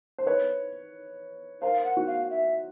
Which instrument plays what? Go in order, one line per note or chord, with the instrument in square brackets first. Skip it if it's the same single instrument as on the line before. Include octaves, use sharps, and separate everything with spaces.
[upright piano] C5
B4 C#5
[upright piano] A#4 C5 [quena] F5
[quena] F#5
[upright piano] F#4
[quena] F5
E5